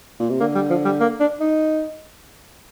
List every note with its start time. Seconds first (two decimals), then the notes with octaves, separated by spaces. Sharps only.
0.20 A#2
0.30 C3
0.40 D3 A#3
0.55 G3
0.70 F3
0.85 G3
1.00 A#3
1.20 D4
1.40 D#4